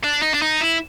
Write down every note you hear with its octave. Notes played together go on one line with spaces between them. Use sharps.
D4
D#4
D4
D#4
E4